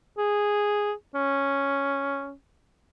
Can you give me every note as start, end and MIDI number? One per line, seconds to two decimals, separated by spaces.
0.18 0.92 68
1.15 2.33 61